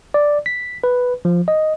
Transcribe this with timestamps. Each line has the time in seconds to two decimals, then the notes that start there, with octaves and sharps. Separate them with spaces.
0.14 D5
0.46 B6
0.84 B4
1.25 F3
1.48 D#5